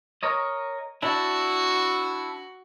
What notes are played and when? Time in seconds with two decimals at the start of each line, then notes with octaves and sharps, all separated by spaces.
0.23 A#4 C#5 D#5
1.02 D4 E4 F#4